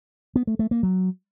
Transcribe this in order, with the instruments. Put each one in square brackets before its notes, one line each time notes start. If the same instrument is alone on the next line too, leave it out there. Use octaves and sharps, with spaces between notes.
[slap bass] B3
A3
A3
A#3
F#3